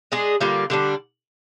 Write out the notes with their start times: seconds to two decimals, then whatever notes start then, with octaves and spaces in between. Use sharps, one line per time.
0.12 G#3 D4 G#4
0.40 D3 G3 A#3 F4
0.70 D3 G3 D4